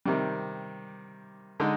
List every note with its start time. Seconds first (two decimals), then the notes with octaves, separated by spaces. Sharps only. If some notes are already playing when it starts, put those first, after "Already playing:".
0.05 C3 D#3 G3
1.60 D3 G#3 D#4